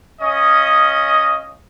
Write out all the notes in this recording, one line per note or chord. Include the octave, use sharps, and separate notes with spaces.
C#4 D#5 F5 D#6